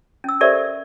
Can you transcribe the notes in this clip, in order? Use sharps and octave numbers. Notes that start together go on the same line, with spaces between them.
C#4 E6
G4 A4 A#4 C5 D5 E5